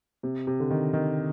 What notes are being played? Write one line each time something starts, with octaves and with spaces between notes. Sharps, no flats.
C3
C3
D3
D#3
D#3